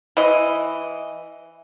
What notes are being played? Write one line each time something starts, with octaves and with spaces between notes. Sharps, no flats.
E3 D#5